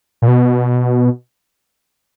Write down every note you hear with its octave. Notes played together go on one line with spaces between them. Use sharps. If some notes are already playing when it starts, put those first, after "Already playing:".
A#2
B2